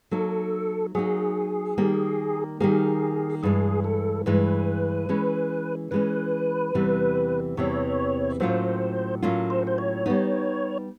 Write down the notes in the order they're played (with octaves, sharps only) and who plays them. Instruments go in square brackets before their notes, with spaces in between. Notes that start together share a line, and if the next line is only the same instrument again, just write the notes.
[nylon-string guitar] F#3 A#3 D#4 [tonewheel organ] A4
[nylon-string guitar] F#3 A#3 D#4 [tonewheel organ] G#4
[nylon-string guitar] D#3 G3 A#3
[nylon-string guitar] D#3 G3 A#3 [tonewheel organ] G#4
[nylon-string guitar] G2 E3 G#3 [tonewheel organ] G#4
[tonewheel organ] A4
[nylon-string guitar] G2 E3 G#3 [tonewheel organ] B4
[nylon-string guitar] E3 G#3 C#4
[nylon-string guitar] E3 G#3 C#4 [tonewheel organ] B4
[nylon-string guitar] E2 C3 E3 G3 C4
[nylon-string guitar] E2 C3 E3 G3 C4 [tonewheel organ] C#5
[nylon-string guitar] A2 F#3 A#3 C#4 F4 [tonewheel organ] C5
[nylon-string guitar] A2 F#3 A#3 C#4 F4
[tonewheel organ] C5
C5
C#5
[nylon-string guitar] G3 B3 D#4